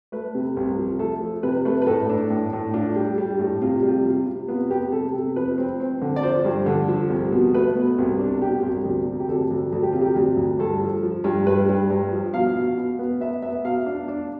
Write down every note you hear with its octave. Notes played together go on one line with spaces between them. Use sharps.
A3 B4
C3
C2
F3
A3 A4
F3
C3 B4
A3 B4
B4
A2 A4
D4
A2
A2
D4 F4
G3
G3
A2
C3 F4
G3
F4
C3
C3
B3 F4
B3 G4
C3 A4
C3
F3 B4
C4
C4
D3
D5
F3 C5
G2
D3
F3
C2
B2
A3 B4
B2
C2
D4
B2 G4
C2
D2
C3
G4
D2 A4
D2
D2 A4
G4
C3 F4
G4
D2
D2
G2 A4
F3
F3
G2
G2 B4
G2
G2
F3
B2 F5
B2
B2
B3
B3 E5
B3 E5
B2 F5
D4
D4